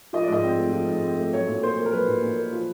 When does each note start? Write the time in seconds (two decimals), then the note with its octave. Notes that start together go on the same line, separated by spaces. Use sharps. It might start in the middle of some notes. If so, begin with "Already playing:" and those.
0.13 F3 D#5
0.23 D5
0.28 G#2 D#5
0.43 C4
0.59 A3
0.73 F3
0.88 G#2
1.03 C4
1.18 A3
1.33 F#3 C#5
1.48 A#2
1.63 A#2 C5
1.78 A#3
1.86 A#4
1.93 F#3 B4
2.08 A#2
2.23 A#2
2.38 A#3
2.53 F3